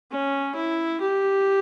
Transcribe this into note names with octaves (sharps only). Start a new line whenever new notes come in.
C#4
E4
G4